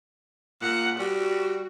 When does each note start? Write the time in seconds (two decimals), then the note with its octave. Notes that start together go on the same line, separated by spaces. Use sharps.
0.62 A#2 F#5
0.99 G3 F#4